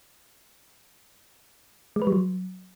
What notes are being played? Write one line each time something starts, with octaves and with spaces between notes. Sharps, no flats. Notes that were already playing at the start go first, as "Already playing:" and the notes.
G#3
B4
G3
F#3